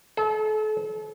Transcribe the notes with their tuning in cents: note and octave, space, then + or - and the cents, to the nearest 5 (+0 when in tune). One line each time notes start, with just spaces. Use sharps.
A4 -35